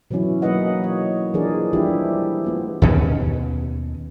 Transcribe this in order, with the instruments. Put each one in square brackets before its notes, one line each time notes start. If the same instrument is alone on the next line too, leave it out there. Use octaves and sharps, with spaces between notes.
[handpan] B2 E3 F#3 C#4 E4
F#3 A#3 D#4 B4 D#5 F#5
C#5
E3 F3 D4 G#4 A#4 D5
E3 F3 G3 D4 E4 G4
A3 B3 F4
[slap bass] D#2 B2 C#4